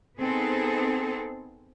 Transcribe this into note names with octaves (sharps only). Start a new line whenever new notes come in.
B3 C4 D#4 G#4 A4